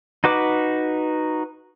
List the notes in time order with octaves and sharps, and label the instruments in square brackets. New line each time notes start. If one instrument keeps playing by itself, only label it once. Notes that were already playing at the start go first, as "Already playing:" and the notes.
[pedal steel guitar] D#4 F#4 B4 D6